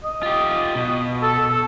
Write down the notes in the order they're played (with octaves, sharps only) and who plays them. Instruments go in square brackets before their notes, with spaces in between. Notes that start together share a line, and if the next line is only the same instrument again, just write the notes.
[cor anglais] D#5
[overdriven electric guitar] F4 G4
B2
[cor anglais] A4
A4